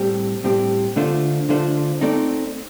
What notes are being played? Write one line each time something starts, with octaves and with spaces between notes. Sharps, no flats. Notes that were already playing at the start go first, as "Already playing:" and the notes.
Already playing: A2 G3 C4 G4
A2 G3 C4 G4
D3 A3 D4 F4 C5
D3 A3 D4 F4 C5
A3 C4 D#4 A4 D5